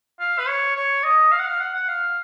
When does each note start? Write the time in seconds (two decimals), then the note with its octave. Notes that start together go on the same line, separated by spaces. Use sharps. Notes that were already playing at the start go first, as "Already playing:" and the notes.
0.20 F5
0.38 B4
0.48 C#5
0.76 C#5
1.04 D#5
1.32 F5
1.39 F#5
1.46 F5
1.60 F#5
1.74 F#5
1.88 F5